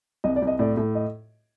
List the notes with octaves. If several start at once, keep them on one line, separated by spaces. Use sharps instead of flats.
C2 D#5
D5
C2
D#5
A2 D5
A2
D#5